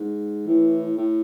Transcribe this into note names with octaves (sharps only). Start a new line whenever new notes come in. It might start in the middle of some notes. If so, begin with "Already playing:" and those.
Already playing: G#2
A2 E3
A2